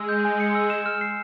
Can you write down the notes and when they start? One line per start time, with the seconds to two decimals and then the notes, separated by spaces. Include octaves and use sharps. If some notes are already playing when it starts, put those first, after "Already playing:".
Already playing: G#3 E6
0.09 G6
0.25 G#5
0.40 C#7
0.55 E6
0.70 E7
0.86 F6
1.01 C7